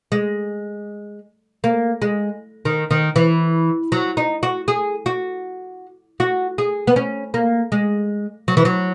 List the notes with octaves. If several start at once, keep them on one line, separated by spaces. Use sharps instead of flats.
G#3
A#3
G#3
D#3
D#3
E3
F#3
D#4
F#4
G#4
F#4
F#4
G#4
B3
C#4
A#3
G#3
F#3
E3
F#3